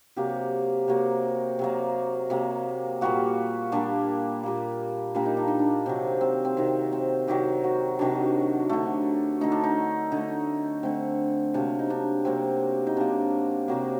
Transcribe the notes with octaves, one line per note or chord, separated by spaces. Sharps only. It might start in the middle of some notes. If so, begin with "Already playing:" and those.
C3 F#3 A#3 G4
C3 F#3 A#3
C3 F#3 A#3
C3 F#3 A#3
A#2 G3 A#3 F#4
A#2 G3 A#3 D4
A#2 G3 A#3
A#2 G3 A#3 D4
D#4
D4
D#4
D4
C3 D#3 F#3 C4
C4
C4
C3 D#3 F#3 C4
C4
C3 D#3 F#3 G4
F#4
C3 D#3 F#3 D4
D3 A3
D3 A3 D#4
D4
D#4
D3 D#4
A3
D3 A3 C4
C3 F#3 A#3 D4
D#4
D4
C3 F#3 A#3 C4
D#4
C3 F#3 A#3 D4
C3 F#3 A#3